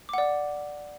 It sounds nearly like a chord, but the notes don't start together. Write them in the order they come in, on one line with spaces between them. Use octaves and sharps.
D6 F#5 D5